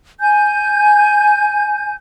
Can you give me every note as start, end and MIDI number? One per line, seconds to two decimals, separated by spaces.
0.21 1.94 80
0.21 1.94 91